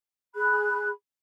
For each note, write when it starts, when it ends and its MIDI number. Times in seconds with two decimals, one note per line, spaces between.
0.35 0.89 68
0.35 0.89 83
0.35 0.89 90